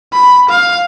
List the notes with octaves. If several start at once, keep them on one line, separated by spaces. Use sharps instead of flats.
B5
F5